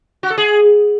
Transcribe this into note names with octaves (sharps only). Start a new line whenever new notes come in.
F#4
A4
G#4